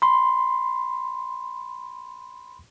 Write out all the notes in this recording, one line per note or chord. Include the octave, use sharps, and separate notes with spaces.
B5 C6